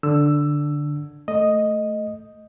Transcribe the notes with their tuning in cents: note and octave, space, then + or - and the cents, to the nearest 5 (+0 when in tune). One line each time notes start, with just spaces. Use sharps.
D3 +0 E6 +10
A3 +0 D#5 +0